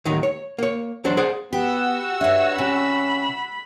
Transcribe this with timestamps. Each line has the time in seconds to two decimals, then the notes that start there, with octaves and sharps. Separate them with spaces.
0.05 D#2 A2 D#3 F#3 D#4
0.23 C#5
0.58 A#3 C#5
1.05 E2 F#3 D4 C5
1.17 G#4 C5 D5 F#5
1.53 B3 F#4 G4 F#5 E6
2.21 G2 D4 C#5 E5
2.58 C3 C#4 B5